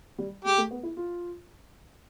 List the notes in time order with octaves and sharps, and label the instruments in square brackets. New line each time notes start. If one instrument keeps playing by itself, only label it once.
[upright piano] G3
[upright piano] G#3 [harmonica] G4
[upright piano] A3
B3
E4
F4